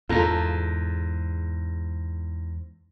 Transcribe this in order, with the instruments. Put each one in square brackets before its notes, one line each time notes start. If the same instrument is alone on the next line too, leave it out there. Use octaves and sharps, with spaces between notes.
[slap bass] E2 G#2 [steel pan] F4 A4 A#5